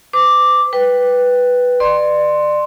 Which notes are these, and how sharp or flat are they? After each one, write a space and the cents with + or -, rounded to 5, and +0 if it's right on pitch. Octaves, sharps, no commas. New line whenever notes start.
C5 -45 D6 +0
B4 +0 G5 +0
D5 +30 C6 +0